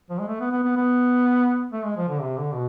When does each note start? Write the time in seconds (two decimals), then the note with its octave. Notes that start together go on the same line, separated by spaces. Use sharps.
0.10 F3
0.19 G#3
0.28 A3
0.40 B3
0.52 B3
0.64 B3
0.76 B3
1.72 A3
1.85 G#3
1.97 F3
2.09 D3
2.21 C3
2.37 D3
2.53 B2